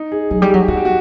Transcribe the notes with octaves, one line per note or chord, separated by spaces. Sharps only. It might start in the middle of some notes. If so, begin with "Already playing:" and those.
Already playing: D#4
G#4
F#3 G#4
G3
F#3 G4
G3 F#4
G4
F#4